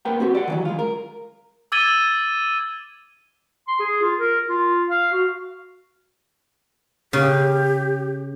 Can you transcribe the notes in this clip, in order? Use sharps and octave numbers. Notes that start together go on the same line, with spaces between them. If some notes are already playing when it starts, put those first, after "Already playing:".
A#3 A#4 B4 F#5 G5
C4 F#4 G4
D5 F#5
D#3 E3 F#3
G#3 F4
A#4
D6 E6 G#6 A6 D#7 G7
C6
G#4
F4
A#4
F4
F5
F#4
C#3 G4